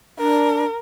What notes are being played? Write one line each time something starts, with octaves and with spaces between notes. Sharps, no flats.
D4 A#4